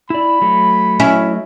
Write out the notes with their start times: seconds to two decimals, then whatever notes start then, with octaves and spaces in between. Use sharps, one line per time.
0.10 E4 D5 B5
0.41 F#3 A3
1.00 C#4 E4